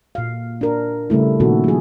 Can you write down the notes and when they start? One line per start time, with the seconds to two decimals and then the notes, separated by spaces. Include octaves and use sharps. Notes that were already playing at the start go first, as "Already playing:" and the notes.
0.15 A#2 F5
0.61 D4 A#4
1.10 C#3 G3 A3 E4
1.40 A#2 D#3 B3 C#4 F#4 A4
1.64 F3 G#4